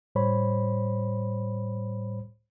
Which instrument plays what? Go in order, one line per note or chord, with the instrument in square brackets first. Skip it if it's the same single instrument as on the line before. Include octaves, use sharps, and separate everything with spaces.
[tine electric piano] A2 G3 C5 C#5 B5